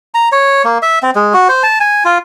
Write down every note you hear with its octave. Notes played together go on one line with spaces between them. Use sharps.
A#5
C#5
A#3
E5
C4
G#3
F#4
C5
A5
G#5
F4